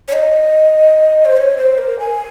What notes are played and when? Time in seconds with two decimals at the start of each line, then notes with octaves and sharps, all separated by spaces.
0.08 C#5
0.13 D#5
1.25 C5
1.37 C#5
1.57 C5
1.78 A#4
2.00 G#5